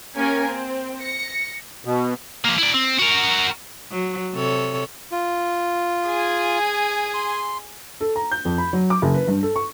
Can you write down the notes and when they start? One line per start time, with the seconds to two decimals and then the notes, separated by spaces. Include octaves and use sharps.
0.16 A#3 C#4 G4 A#4 G#5
0.49 C4
1.01 A#6 C#7
1.85 B2
2.45 F3 A#3
2.59 E4 D5
2.74 C4
2.99 F#4 A#4
3.92 F#3
4.34 C3 A4 C#5
5.11 F4
6.06 G#4 G#5
7.14 C6
8.01 A4
8.16 A#5
8.31 G6
8.45 F2
8.58 B5
8.73 F#3
8.90 D6
9.02 F#1
9.14 B4
9.28 G2
9.43 A4
9.56 C#6